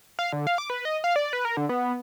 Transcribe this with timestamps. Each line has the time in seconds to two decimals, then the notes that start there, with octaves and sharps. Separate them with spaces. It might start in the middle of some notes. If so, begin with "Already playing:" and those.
0.19 F5
0.33 D3
0.47 F5
0.58 D6
0.70 B4
0.85 D#5
1.04 F5
1.16 D5
1.33 B4
1.45 A#4
1.57 D3
1.69 B3